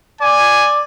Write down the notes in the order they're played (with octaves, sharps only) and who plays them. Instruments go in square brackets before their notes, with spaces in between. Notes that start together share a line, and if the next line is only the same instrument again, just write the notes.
[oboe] D5 [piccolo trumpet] G#5